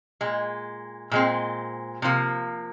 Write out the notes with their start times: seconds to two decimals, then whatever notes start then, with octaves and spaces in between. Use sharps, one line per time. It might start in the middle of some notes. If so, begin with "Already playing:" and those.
0.21 A#2 G#3
1.11 A#2 G#3 C4
2.02 C3 F3 A#3